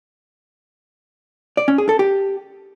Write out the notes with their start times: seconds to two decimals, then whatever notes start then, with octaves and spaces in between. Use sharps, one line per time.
1.57 D5
1.68 C#4
1.78 G#4
1.89 A4
1.99 G4